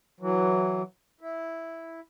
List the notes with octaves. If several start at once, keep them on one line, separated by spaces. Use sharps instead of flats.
E3 F#3
E4